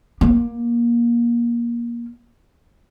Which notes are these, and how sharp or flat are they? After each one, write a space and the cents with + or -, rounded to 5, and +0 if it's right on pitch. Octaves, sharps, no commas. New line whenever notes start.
A#3 +20